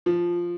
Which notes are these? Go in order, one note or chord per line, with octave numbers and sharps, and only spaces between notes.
F3